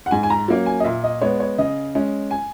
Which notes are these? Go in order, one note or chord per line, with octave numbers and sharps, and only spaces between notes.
F#5
G#2 G#5
G#5
A#5
F#3 A#3 C#4
G#5
D#5
A#2 E5
D#5
G#3 B3 C#5
C#5
C#3 D#5
G#3 C#4
G#5